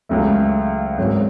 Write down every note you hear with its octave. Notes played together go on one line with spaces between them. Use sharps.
C#2 C#3 F#3 A3
G#1 G#2 F#3 C#4